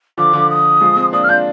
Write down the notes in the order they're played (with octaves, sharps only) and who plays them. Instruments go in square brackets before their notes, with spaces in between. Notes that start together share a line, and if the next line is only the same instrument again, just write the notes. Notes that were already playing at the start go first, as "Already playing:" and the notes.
[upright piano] D3 F3 [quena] D6
[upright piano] D3 F3
[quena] D#6
[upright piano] F3 G#3
G#3 C4
[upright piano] A#3 D4 [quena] D#6
[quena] F6
[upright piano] D4 F4 [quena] G6